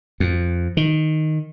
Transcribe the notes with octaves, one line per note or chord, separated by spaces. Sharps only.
F2
D#3